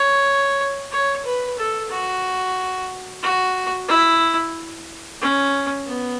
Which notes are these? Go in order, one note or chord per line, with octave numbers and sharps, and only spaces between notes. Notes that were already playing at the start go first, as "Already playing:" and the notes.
Already playing: C#5
C#5
B4
A4
F#4
F#4
E4
C#4
B3